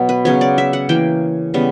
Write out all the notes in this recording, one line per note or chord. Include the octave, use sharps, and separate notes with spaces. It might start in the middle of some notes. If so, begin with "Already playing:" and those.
Already playing: B2 F#3
B4
C#3 F#3 B3 C#5
D5
E5
F#5
E3 A#3 G5
C#3 G3 B3